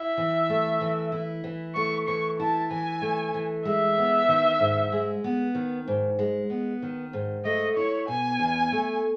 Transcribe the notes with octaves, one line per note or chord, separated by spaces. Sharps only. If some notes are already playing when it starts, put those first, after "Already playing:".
Already playing: E4 E5
E3
A3
E3
E4
E3
A3 C#6
E3 C#6
E4 A5
E3 G#5
A3
E3
G#3 E5
B3
D#3
G#2
G#3
B3
D#3
G#2
G#3
B3
D#3
G#2
A3 D#5
E4 C#5
B2 G#5
E2
A3